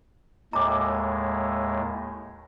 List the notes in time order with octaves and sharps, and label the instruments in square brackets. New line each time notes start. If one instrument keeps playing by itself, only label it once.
[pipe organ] D#2 A2 G#3 [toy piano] A#5 D6